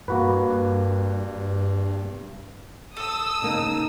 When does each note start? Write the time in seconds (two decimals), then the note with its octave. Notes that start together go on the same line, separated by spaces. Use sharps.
0.08 G2 A#3 F#4 B4
2.97 A4 D#6 E6
3.42 C#3 A#3 D#4